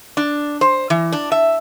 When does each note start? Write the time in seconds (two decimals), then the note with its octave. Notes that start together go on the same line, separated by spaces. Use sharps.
0.17 D4
0.61 C5
0.90 E3
1.13 D4
1.32 E5